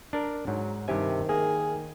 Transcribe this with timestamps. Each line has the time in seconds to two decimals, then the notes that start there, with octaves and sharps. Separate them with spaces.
0.13 D4 A#4
0.47 G#2 F#3
0.88 G2 C3 D#3 G4 G#5
1.29 A#3 G#4